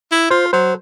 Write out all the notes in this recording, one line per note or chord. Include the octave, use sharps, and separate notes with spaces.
E4
F4 C5
F#3 C5